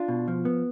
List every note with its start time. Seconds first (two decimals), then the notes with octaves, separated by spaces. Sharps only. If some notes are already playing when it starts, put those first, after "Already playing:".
Already playing: D4 F4
0.08 B2
0.28 F3
0.45 B3